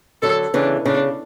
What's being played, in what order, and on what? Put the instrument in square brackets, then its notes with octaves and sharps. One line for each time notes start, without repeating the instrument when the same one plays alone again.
[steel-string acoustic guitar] D3 F#3 [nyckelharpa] A4
[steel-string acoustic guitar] C#3 E3 [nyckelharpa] D4
[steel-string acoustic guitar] C#3 [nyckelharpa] D4